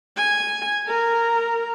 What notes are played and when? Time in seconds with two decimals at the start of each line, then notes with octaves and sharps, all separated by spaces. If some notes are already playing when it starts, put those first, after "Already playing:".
0.17 G#5
0.88 A#4